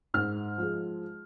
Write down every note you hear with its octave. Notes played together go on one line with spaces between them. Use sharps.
G#2 F6
F3 G#3